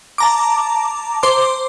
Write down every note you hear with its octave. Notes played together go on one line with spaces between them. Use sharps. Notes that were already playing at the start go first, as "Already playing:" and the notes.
A5 A#5 D6
C5 C6 D6